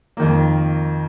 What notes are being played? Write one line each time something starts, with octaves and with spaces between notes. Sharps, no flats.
F2 D#3 A#3